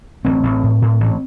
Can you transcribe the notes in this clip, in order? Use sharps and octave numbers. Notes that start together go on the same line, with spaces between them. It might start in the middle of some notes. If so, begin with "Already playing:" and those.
A1 C4
A1
A2
A2
A1